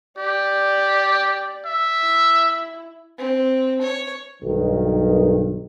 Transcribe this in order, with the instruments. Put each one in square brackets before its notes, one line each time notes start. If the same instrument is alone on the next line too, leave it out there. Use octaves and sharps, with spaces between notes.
[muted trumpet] G4 [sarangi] D5
[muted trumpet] E5
[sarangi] E4
[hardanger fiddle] C4
C#5
[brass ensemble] B1 G2 D#3